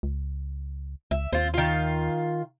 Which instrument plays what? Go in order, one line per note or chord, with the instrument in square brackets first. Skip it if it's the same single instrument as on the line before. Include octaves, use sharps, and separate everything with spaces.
[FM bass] C#2
[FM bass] C#2 [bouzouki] E5
[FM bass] D#2 [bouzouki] C4 F4
[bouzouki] D#3 F4